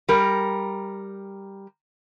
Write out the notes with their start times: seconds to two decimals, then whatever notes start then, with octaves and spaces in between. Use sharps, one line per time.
0.09 G3 A#4